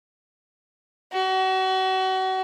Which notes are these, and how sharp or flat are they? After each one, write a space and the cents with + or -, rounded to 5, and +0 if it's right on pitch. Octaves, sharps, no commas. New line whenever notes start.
F#4 +35